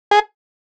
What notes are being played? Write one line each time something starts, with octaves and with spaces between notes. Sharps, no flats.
G#4